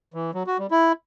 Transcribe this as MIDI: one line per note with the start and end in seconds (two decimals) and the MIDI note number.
0.14 0.31 52
0.34 0.43 54
0.47 0.57 66
0.59 0.67 55
0.71 0.92 64